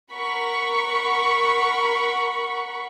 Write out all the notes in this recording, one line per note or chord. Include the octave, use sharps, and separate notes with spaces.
A#4 F#5 B5 C#6